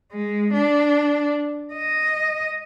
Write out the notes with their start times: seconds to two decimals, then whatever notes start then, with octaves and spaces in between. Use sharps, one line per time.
0.12 G#3
0.54 D4
1.74 D#5